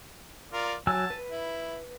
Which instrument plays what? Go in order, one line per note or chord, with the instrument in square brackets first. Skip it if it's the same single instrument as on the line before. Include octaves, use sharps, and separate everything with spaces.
[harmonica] F4 A#4 D5
[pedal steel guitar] F#3 G#5 E6 [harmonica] A5
[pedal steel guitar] B4
[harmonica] E4